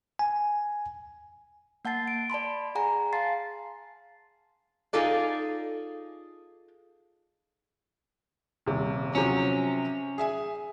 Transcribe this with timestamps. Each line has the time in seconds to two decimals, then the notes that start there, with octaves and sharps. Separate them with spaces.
0.19 G#5
1.85 A#3 F#5 A5 A6 C7
2.08 D7
2.30 D5 A5 B5 C6
2.75 G#4 F#5 G#5 A#5
3.13 F5 A5 C6 A6 C7
4.93 D#4 F4 G#4 A4 D5
8.66 D#1 C3
9.15 C3 F3 F#3 C#4
10.18 G#4 E5 G#5